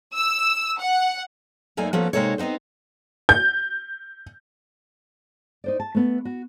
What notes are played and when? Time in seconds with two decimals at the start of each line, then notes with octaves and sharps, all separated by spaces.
0.14 E6
0.79 F#5
1.77 F#2 A3 A#3 D#4 D5 G#5
1.93 F3 A#3 B3 C#4 F#4 A4
2.13 C3 G#3 A#3 D#4 A4 C#5
2.38 B3 C4 D#4 F#4 C5
3.29 G6
5.64 D#4 C5 D5
5.80 A5
5.95 A3 B3
6.25 F#4